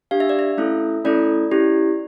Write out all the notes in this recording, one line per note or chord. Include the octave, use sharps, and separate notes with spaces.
D4 G4 F5
E5
D5
E5
A3 C#4 E4 A4
A3 C#4 E4 A4 D5
C#4 E4 G4